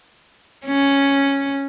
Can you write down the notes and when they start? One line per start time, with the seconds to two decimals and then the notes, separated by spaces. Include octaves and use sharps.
0.66 C#4